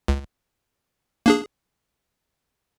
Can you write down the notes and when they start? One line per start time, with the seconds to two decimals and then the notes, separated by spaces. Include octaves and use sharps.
0.08 C#2
1.26 A#3 D4 G#4